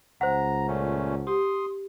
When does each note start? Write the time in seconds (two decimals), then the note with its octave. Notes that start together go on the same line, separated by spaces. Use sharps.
0.21 C#2 C5 F#5 A#5
0.68 A#2 A3 C#4
1.27 G4 C6 D#6